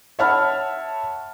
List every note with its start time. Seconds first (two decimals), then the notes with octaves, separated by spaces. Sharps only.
0.19 C#5 E5 F#5 A5 B5 F6